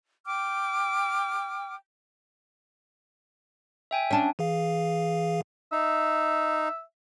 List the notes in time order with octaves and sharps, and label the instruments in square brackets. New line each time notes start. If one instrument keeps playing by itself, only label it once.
[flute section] G5 D6 F6
[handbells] E5 G5 G#5
[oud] C#4 D4
[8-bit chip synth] E3 G#4 F5
[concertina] D#4 [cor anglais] E5